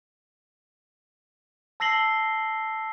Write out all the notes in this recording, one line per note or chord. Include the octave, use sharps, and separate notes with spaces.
A5 E6 A#6 C7 F#7 G7